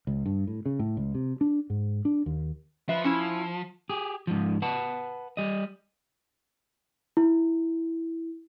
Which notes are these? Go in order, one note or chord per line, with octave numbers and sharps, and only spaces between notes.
C#2
G2
A2
C#3
A2
C#2
C3
D4
G#2
D4
D#2
F3 B4 E5
C#4 E4
G4 G#4
G#2 F3
B4 F#5 A5 B5
G3 D#5
E4